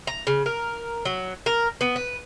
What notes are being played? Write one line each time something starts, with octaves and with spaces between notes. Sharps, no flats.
A#5
C#3
A#4
F#3
A#4
B3
B4